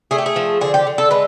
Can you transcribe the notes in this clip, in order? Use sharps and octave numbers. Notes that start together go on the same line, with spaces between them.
A3 G#4
G4
G#4
F3
D3 G#4
G4
D3
A4
G#3 B4